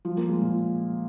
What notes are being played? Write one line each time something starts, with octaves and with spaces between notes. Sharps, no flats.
F3
A#3
G#3
A#2